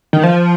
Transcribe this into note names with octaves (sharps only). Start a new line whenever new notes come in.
D#3
F3